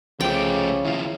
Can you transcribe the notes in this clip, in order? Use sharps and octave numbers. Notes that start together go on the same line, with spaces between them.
C2 C#3 F3 A3 C5 G5 D6
D#2 F3 E4 F5